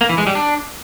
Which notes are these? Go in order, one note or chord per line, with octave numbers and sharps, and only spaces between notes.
A#3
E3
G#3
G3
D4